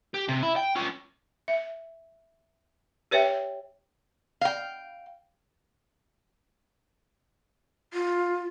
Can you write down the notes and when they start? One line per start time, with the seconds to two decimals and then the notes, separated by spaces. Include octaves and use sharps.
0.14 G4
0.28 C3
0.43 E4
0.57 G5
0.76 C#4 F4
1.48 E5
3.11 G4 B4 C#5 E5 G5
4.41 F5 G5
7.94 F4